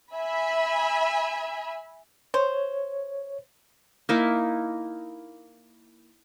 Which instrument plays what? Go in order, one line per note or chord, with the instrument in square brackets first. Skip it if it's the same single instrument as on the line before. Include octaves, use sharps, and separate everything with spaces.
[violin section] E5 G#5 B5
[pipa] C5 [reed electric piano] C#5
[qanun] A#3 D#4 E4